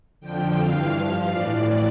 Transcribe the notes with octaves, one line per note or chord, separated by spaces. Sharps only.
F2 D3 F3 G5
G2 E3 F5
G2 F3
A2 E3 D5